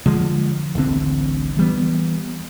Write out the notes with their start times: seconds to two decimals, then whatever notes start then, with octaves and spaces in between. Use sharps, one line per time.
0.06 D3 F3 G#3
0.75 D1 A1 D3 C4
1.57 E3 G3 B3